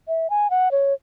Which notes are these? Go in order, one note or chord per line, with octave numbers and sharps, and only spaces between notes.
E5
G#5
F#5
C#5